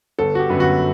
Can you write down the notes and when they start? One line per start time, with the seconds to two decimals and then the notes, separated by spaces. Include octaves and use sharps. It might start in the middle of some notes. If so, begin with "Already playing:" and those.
0.19 G1 A4
0.35 F#4
0.39 G4
0.49 F#2 D3 G3 B3
0.60 F#4